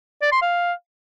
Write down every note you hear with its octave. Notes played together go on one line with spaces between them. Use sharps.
D5
C6
F5